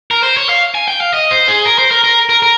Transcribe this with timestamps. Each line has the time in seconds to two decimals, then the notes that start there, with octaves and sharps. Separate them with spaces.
0.11 A#4
0.23 C5
0.37 C#5
0.49 F5
0.75 G#5
0.88 G5
1.01 F5
1.14 D#5
1.31 C5
1.48 G#4
1.65 A#4
1.78 C5
1.91 A#4
2.04 A#4
2.29 A#4
2.42 A#4